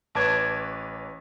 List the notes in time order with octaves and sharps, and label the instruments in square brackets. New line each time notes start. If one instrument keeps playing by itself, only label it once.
[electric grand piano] A1 B4 C#5 [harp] A5 D6 G#6